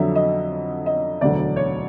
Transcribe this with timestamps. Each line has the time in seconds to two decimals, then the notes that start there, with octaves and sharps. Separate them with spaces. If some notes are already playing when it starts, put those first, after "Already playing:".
Already playing: F2 D3 F#3 E5
0.15 D#5
0.86 D#5
1.21 E1 D2 D3 F#3 D5
1.56 C#5